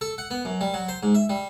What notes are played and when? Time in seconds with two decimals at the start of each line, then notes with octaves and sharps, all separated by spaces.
0.01 A4
0.18 F#5
0.31 B3
0.45 F#2
0.61 G3
0.74 F#3
0.89 C5
1.03 G#2
1.15 E5
1.30 G3